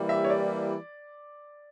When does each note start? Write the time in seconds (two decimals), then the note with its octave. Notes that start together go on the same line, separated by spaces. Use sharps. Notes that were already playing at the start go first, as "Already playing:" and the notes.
Already playing: E3 G3 A#3 E4 G4
0.09 E5
0.24 C#5
0.30 D5